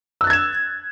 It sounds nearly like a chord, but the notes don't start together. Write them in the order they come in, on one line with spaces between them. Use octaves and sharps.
E6 F#6 A6 G#6 E7